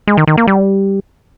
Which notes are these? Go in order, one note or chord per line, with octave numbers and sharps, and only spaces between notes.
G#3
D#3
D#3
A#3
G3